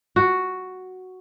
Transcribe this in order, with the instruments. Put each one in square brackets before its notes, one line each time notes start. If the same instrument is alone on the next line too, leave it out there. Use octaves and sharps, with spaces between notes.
[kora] F#4